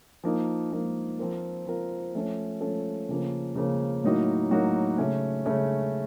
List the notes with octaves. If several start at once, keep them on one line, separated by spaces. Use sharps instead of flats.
F3 A#3 D#4
F3 A#3 D#4
F3 C4 F4 A#4
F3 C4 F4 A#4
F3 A3 C#4 A4
F3 A3 C#4 A4
C#3 F3 A#3 C#4
C#3 F3 A#3 C#4
A2 F#3 A#3 D#4 F#4
A2 F#3 A#3 D#4 F#4
C#3 A3 C#4
C#3 A3 C#4